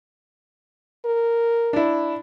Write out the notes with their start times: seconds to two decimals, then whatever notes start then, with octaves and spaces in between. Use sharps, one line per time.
1.05 A#4
1.73 D4 E4